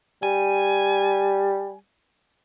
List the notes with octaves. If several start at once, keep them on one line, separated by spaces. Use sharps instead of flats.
G3 G#5